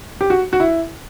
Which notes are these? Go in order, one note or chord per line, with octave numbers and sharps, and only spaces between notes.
G4
F#4
F#4
E4